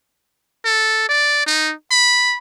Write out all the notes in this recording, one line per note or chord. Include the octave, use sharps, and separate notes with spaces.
A4
D5
D#4
B5